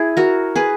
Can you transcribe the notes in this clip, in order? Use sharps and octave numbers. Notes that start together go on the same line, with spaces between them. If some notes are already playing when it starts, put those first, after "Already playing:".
Already playing: E4 G#4
F#4 A#4
G#4 B4